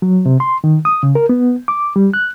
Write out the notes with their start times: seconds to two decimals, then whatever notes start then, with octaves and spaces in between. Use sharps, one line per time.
0.02 F#3
0.26 C3
0.40 C6
0.64 D#3
0.85 D#6
1.03 C#3
1.15 A#4
1.29 B3
1.68 D6
1.96 G3
2.14 F#6